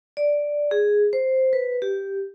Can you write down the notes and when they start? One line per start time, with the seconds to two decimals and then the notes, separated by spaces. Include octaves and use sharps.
0.17 D5
0.71 G#4
1.13 C5
1.53 B4
1.82 G4